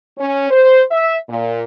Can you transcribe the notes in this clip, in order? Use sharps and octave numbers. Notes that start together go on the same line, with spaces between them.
C#4
C5
E5
A#2